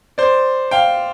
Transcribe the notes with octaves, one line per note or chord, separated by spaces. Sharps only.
C5 D5
F5 G5